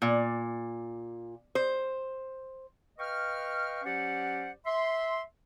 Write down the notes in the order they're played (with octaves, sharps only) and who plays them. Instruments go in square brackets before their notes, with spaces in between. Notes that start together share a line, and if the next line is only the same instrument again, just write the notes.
[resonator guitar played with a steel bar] A#2
C5
[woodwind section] B4 D#5 F5 G5 C#6 F6
F#3 C#4 G4 C5 D5 F#5
E5 C6